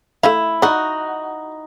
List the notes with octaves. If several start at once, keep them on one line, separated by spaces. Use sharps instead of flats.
A3 E4 E5 F5
D#4 F#4 D5 F#5